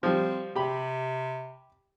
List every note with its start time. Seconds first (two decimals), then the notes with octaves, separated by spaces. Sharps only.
0.03 F3 G3 C4
0.55 C3 G4 B5